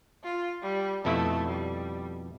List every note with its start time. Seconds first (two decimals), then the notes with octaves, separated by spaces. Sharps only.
0.23 F4
0.62 G3
1.05 F2 B2 A3 E4
1.47 G3